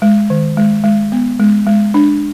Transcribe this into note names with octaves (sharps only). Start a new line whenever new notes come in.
G#3
D#3
G#3
G#3
B3
G#3
G#3
D4